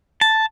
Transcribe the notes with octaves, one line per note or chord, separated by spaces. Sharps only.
A5